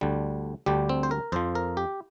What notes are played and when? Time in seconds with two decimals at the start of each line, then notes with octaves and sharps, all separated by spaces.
0.01 D2 D3 G3
0.66 D2 D3 G3 G4
0.89 C4
1.03 C5
1.11 A#4
1.32 F2 F3 C5
1.55 A#4
1.77 G4